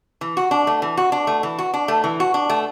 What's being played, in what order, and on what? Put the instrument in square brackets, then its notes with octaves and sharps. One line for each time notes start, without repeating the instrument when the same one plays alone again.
[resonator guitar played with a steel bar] E3
F#4
D4
A3
E3
F#4
D4
A3
E3
F#4
D4
A3
E3
F#4
D4
A3